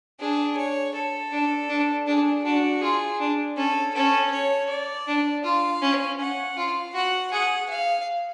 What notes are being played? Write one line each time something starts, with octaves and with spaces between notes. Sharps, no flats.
D4 G#4
C#5
A4
D4
D4
D4 G#4
D4 F#4
F4 G#4
D4
C#4 A4
C#4 A4
C#5
D5
D4
F4 F5
C#4
C#4 F#5
F4 F5
F#4 F#5
G#4 F#5
F5